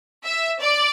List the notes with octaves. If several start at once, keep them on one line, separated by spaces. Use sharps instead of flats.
E5
D5